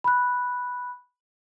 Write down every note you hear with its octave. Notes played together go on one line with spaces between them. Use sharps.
B5 F#6